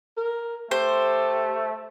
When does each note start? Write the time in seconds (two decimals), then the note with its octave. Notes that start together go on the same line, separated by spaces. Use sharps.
0.17 A#4
0.71 A3 G4 C5